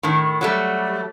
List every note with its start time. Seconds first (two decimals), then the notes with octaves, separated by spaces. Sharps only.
0.03 A2 D#3
0.41 F#3 G3 A3